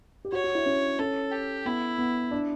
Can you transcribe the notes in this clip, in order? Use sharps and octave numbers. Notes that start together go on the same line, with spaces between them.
G4
F#4 C#5
F#4
E4
C#4
C#4 A4
G4
B3 E4
B3
D4